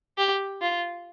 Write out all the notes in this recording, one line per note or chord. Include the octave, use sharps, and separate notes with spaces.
G4
F4